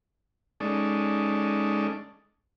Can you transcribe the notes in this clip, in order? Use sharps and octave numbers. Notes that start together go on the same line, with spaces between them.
G#3 C#4 D#4 A4 D5